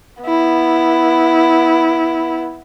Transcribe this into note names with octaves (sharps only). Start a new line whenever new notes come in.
B3 E4